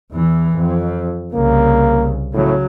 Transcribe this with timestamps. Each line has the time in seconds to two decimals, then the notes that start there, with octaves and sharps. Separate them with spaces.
0.12 E2 E3
0.57 F2
1.34 C2 C#3 A#3
2.34 A2 C#3 F#3